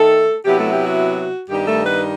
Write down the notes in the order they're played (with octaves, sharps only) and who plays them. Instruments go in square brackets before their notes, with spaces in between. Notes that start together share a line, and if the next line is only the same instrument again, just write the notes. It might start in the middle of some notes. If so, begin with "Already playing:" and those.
Already playing: [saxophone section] D#3 A3 A4
C3 F#3 B3 E4 G4
A3 A4
G4
F#4
G2 D#3 G3 B3 D#4 G4
A3 A4
B3 B4